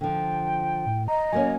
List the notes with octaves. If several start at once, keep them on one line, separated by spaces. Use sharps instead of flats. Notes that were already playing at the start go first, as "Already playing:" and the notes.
D3 F3 G5
A2
D#5 A#5
F#3 A#3 C#4 G#5